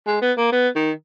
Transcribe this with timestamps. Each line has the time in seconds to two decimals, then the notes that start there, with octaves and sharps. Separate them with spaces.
0.06 G#3
0.22 B3
0.37 A#3
0.52 B3
0.75 D#3